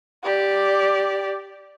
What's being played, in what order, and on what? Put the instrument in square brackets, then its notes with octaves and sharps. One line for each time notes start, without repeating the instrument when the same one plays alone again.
[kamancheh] G4 D5